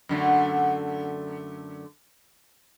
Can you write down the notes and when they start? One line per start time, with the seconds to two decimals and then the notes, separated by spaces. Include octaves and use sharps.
0.09 F#2 D3 A3